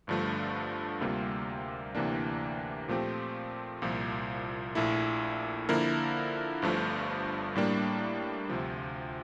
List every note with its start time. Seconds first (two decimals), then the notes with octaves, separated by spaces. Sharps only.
0.07 G1 G2 D3 F3 A3
1.01 D2 C3 G3 A#3 F4
1.95 D2 C3 E3 A#3 D4
2.88 A#2 F3 A3 C4 G4
3.82 C2 A#2 F3
4.75 A#1 A#2 A3 E4
5.69 D3 F3 A#3 E4 A#4
6.62 G1 G2 F3 A3
7.55 A2 G3 A#3 D4
8.50 D2 C3 F3